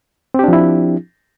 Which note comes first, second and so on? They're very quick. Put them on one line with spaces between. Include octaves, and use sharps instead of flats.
C4 G4 D4 F3 E4